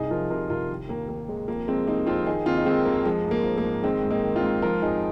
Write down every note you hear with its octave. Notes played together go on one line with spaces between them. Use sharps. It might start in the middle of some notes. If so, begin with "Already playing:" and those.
Already playing: C2 D#4 G#4
F3 F4 A#4
C3 F4 A#4
C2 F4 A#4
D#3
D#2 A#3
D#3 A#3
D#2 G#3
F2 A#3
F3 G#3 C4
C3 A#3 D#4
F2 C4 F4
D#3 D#4 G#4
D#2 C4 F4
D#4
D#3 G#3 C4
D#2 A#3
F3 G#3
G#2
A#3
F3
A#3
G#2
D#3 G#3 C4
G#2
A#3 D#4
D#3
C4 F4
G#2
F3 F4 A#4
F2 D#4 G#4